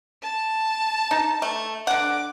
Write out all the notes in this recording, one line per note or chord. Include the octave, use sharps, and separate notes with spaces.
A5
D#4
A3
D3 F#5 D6